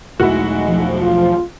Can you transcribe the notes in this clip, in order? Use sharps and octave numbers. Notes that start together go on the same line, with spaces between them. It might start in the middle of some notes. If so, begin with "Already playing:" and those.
B1 E2 G#3 A3 D#4 E4 F#4
F3
F4